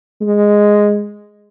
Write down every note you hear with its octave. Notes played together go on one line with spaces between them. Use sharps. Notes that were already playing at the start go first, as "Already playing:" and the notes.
G#3